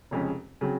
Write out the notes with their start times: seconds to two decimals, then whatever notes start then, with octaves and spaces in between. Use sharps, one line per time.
0.11 F1 F2 C#3 G#3 C#4
0.61 C#3 F#3 C4